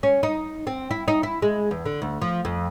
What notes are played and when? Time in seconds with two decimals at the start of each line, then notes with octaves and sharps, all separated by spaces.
0.03 C#4
0.23 D#4
0.67 C4
0.91 E4
1.08 D#4
1.23 E4
1.42 G#3
1.71 E2
1.86 D3
2.02 D2
2.22 F3
2.45 F2